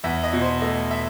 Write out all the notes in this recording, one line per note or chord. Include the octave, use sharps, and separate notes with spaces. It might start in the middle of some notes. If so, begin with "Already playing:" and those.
E2 E5
D#5
B2
C5
A3 D#5
E5